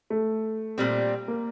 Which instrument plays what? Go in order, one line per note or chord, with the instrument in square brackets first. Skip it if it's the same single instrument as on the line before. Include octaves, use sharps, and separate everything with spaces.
[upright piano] A3
[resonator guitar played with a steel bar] A#2 G3 C4
[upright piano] A#3